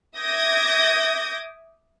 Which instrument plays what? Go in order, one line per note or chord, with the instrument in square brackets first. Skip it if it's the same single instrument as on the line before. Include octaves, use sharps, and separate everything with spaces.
[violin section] E5 D6 D#6 G6 G#6 A#6